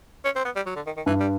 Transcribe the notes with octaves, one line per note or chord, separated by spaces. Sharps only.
C#4
C4
B3
G3
F#3
D3
D#3
D#3
G2 E3
G3